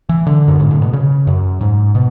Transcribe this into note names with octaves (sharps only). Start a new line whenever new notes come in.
E3
D3
F#2
G#2
A2
B2
C#3
F#2
G#2
B2